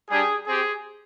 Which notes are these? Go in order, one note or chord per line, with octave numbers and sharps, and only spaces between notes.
G3 D4 G4 G#4
C4 G4 G#4